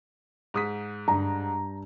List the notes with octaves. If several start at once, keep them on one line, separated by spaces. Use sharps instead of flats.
G#2 D#6 B6
G2 A#5